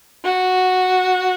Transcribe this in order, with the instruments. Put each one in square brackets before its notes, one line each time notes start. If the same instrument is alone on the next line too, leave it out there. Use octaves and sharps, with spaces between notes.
[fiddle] F#4